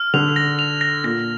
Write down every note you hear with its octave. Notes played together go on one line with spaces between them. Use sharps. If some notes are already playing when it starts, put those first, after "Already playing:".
Already playing: F6
D3 F7
A#6
F7
A#6
A#2 A#6